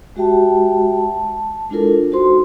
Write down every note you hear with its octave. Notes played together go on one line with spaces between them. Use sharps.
G#3 F#4 G4 E5 G5 A5
A5
G#3 D4 E4 F4 A4 A#4
D#4 F#4 C5 C6